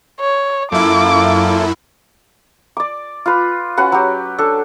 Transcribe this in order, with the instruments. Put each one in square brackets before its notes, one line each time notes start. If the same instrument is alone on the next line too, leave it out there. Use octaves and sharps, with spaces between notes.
[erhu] C#5
[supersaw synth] F#2 E4 [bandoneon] A#3 F4 A4 [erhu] D6
[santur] D5 D6
F4 B4
C#4 F#4 B4 F#5
F#3 G4
D4 A4